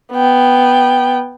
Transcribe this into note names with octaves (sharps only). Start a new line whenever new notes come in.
B3 G5